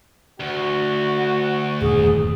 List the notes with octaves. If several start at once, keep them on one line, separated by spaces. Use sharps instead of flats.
D2 F#4
D#1 E2 G2 G#4